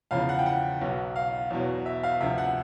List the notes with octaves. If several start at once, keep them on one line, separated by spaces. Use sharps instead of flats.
E2 C#3 F3 F5
F#5
G5
F#5
B1 B2 F#3
F5
E2 B2 F#3
E5
F5
D2 C3 F3 E5
F#5